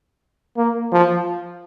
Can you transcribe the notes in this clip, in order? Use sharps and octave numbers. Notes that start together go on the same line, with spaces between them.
A#3
F3